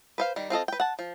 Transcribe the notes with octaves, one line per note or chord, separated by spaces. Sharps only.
B4 C5 F5
D#3 G3
C4 F4 A4 D#5
B4 G5
F#5 A5
F3